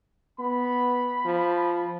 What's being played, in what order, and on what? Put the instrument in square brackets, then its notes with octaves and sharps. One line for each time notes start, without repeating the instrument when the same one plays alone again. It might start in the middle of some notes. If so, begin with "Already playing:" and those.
[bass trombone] B3 [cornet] B5
[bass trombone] F3